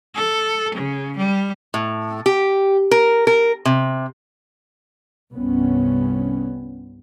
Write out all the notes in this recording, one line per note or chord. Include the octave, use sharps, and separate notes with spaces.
A4
C#3
G3
A2
G4
A#4
A#4
C3
C2 G2 B3 C#4